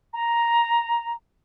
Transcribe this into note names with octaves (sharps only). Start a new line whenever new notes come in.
A#5